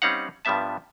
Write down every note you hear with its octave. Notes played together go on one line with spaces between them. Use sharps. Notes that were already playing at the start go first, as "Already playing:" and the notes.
G3 C4 C#4 D#4 F5 F#5
G2 F3 G3 B3 E5 A5